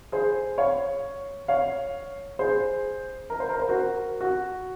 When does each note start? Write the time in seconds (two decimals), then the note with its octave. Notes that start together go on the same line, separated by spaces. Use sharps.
0.12 G#4 C5
0.58 C#5 F5
1.48 C#5 F5
2.39 G#4 C5
3.30 A#4
3.40 C5
3.49 A#4
3.59 C5
3.69 F#4 A#4
4.21 F#4